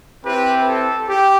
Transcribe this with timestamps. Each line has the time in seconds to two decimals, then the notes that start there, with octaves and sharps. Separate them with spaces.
0.25 C4 E4 G4 B4
0.67 A4
1.09 G4